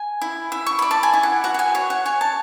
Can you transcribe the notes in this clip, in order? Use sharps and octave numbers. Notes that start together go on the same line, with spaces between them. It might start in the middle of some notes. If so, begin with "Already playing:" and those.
Already playing: G#5
E4
E4
C#6
D5 B5
A5
G#5
E4
F#5
F#4 F#5
F#5
G#5
C#5 F#5
F#5
C#5 G#5
A5